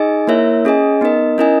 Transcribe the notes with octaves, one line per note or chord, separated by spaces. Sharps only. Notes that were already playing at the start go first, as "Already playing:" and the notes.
Already playing: D#4 G#4 D#5 G#5
A#3 E4 A#4 C#5 E5
C#4 G#4 D#5 G#5
B3 D#4 A#4 D#5
C#4 E4 A#4 D#5 G#5